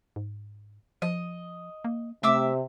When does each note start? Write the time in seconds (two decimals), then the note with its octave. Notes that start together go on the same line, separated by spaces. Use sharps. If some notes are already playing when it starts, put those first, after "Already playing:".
0.16 G#2
1.02 F3 D#5
1.85 A#3
2.23 C3 A3 E5 D6 E6